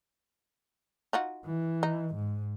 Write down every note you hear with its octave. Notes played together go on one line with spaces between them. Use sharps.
D#4 F4 F#4
E3
D#4
G#2